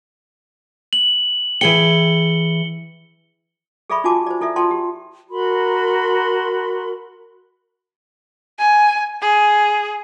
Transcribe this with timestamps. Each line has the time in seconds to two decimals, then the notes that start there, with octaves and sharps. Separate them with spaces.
0.93 F#7
1.61 E3 G#4 G5 C#7 G7
3.90 G#4 A4 D5 E5 B5 C#6
4.04 D#4 F4 F#4 G#5 A5 D6
4.27 C5 D5
4.41 E4 A4 D5 E5
4.56 F4 A4 D5 G5 A5 C6
4.71 G4
5.29 F#4 A#4 B5 C6
8.59 G#5
9.22 G#4